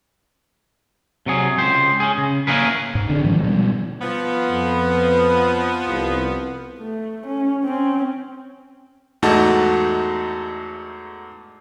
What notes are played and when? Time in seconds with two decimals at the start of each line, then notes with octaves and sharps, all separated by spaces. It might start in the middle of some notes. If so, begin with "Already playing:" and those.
1.26 C3 F#3 G#4
1.58 C#2 G4 C5
2.00 C#4 G#4
2.17 C#3
2.47 A#3 C#4 E4 G#4 A#4 B4
2.95 G#2
3.09 D3 C4 D4
3.24 D#3 F3 G#3
3.43 B2 G3
4.01 F3 B3
4.49 F2 B4
5.87 C2
6.80 A3
7.27 C#4
7.64 C4 C#4
9.22 E2 G#2 A3 D#4 F#4 A5